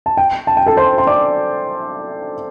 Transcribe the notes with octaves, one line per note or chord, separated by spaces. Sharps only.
A5
G5
A5
G5
A4 A5
C5 C6
C6
D5 D6